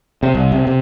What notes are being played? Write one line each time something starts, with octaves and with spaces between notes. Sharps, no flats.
C3
C2
C3
C3